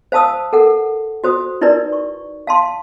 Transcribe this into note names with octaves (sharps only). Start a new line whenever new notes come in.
C5 F5 A5 D#6 E6
A4 A#4 F#5
F#4 C5 D#6
D#4 E4 A#4 B4 D5
C#6
F5 A5 C6